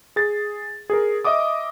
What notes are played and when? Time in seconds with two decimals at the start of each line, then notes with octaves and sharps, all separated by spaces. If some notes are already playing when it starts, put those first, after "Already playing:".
0.16 G#4 A6
0.90 G#4 A#4
1.24 D#5 E5 D6 D#6